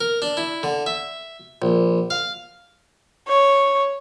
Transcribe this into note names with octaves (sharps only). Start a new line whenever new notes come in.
A#4
D4
E4
D3
E5
A#1
F5
C#5